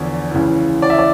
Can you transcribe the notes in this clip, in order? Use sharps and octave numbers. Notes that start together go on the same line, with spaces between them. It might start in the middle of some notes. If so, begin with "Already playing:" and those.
Already playing: E2 D3 F3 C#5 D5
C#2 C#3 E3
D5
E5
D5